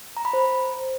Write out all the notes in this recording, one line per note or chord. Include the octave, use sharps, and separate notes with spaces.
A#5
B5
C5